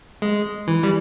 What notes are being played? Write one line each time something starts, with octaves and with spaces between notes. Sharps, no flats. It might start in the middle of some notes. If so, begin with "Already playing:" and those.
G#3
E3
G3